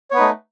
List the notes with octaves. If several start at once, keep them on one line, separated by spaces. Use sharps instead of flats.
A3 B3 D#4 B4 C#5